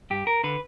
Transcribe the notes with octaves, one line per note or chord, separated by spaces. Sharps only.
G2 G4
A#4
D3 B4